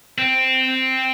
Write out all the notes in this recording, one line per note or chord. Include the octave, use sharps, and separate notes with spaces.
C4